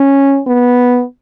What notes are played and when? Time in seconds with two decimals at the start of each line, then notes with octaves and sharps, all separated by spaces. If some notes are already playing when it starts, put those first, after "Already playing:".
Already playing: C#4
0.47 B3